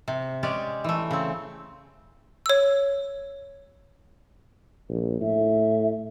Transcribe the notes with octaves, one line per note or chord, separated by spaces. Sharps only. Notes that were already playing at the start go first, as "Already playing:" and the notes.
C3
G#3 C#4 G4 D5
E3 A3
C#3 C4
C#5 E6
A#1
A2 E5